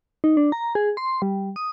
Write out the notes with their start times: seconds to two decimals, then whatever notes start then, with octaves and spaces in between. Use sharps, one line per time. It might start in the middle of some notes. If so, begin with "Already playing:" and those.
0.24 D#4
0.37 D4
0.52 A#5
0.75 G#4
0.97 C6
1.22 G3
1.56 D#6